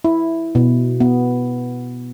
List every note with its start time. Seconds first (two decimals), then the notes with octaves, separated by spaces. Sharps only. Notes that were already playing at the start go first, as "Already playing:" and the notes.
0.04 E4
0.55 B2
1.00 B3